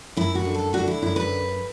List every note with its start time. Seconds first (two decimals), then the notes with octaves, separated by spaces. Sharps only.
0.17 F#2 E4
0.35 F#4
0.45 D3
0.54 A4
0.73 D3 F#4
0.88 E4
1.02 F#2 E4
1.16 B4